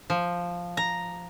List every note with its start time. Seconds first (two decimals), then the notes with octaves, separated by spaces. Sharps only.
0.10 F3
0.77 A#5